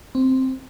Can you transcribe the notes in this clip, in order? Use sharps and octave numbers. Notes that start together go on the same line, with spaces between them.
C4